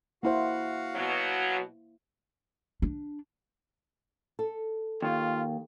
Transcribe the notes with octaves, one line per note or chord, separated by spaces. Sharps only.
A#3 E4 F#4 C5 F5 F#5
B2 F#3
D4
A4
D#2 F4